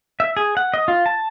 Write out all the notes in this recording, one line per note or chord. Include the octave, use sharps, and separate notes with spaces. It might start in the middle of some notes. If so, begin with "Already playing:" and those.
E5
G#4
F#5
D#5
F4
A5